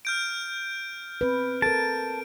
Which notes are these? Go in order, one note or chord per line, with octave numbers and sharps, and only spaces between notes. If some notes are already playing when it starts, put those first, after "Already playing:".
F6 G6 D7
C4 B4
A4 A#4 A5 D7